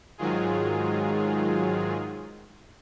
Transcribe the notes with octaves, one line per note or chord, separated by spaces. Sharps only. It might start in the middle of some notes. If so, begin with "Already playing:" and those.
G#2 D#3 F#3 G#3 F4 G#4